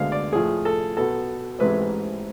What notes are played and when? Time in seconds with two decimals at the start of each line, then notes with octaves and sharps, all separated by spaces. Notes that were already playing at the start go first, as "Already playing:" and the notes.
Already playing: D2 D3 G#3 B3 F5
0.12 D5
0.33 A2 F3 A3 G#4
0.65 A4
0.97 B1 B2 B3 A4
1.59 A1 G#2 E3 G#3 C4 B4